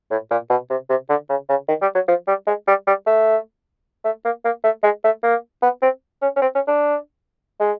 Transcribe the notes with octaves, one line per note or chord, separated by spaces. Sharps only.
A2
A#2
B2
C3
C3
D3
C#3
C#3
D#3
G3
F#3
F3
G3
G#3
G3
G3
A3
A3
A#3
A#3
A3
G#3
A3
A#3
B3
C4
C#4
C#4
C4
C#4
D4
G#3